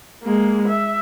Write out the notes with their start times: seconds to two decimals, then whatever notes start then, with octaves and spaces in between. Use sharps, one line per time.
0.23 G#3 A#3
0.69 E5